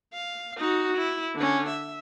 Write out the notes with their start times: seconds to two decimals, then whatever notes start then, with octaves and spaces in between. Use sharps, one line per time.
0.14 F5
0.58 D#4 F#4
0.98 E4
1.36 D3 C#4
1.69 E5